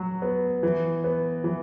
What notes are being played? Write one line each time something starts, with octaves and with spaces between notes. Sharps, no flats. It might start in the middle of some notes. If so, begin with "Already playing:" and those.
Already playing: F#3 F#4
B3
E3
B3
E3